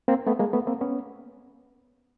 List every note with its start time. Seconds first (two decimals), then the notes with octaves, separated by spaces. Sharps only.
0.08 A#3 C4
0.27 A3 B3
0.40 G#3 A#3
0.53 A3 B3
0.67 A#3 C4
0.81 B3 C#4